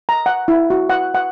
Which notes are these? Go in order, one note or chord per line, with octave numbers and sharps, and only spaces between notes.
A#5
F#5
E4
F#4
F#5
F#5